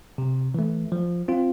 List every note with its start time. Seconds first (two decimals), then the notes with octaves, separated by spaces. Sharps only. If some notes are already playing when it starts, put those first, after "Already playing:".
0.18 C3
0.54 E3 A3
0.92 F3
1.28 C4 F4